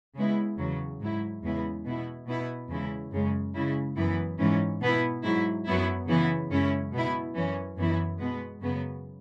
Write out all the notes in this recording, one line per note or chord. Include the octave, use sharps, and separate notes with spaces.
C#3 G#3 B3 E4
E2 C#3 F#3
G#2 F#3 E4
E2 C#3 G#3 B3 E4
B2 B3 E4
B2 B3 E4
E2 C#3 G#3 E4
F#2 C#3 G#3
C#3 G#3 E4
F#2 E3 B3 E4
G#2 E3 C#4
B2 B3 E4
G#2 F#3 E4
F#2 F#3 B3 E4
C#3 E3 B3 E4
F#2 C#3 G#3 C#4 E4
B2 B3 E4
F#2 E3 C#4
F#2 E3 B3 E4
B2 G#3 B3
F#2 C#3 F#3 B3